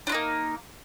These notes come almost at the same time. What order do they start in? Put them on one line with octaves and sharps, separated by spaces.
D4 F4 D#4 A#3